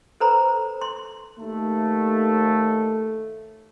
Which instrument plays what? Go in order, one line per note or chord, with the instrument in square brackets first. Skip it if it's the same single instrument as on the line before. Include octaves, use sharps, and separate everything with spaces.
[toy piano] A4 B4 C5 A#5 B5
C6
[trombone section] D#2 A3